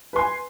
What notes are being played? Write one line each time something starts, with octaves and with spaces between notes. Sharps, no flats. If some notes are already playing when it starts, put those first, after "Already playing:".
B4 G#5 C6